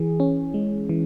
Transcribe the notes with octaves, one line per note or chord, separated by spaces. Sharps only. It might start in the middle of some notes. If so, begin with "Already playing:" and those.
Already playing: E3 G#4
C#4
G#3
E3